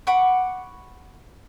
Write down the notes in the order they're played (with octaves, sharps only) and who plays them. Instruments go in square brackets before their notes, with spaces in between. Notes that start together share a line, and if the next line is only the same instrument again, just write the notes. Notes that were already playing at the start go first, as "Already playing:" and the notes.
[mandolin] F#5 B5 C#6 D6